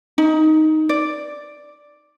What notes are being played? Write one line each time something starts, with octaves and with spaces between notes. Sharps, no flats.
D#4
D5